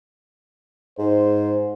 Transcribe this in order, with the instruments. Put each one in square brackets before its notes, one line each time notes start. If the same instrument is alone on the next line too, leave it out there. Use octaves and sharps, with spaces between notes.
[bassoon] G#2 [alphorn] C5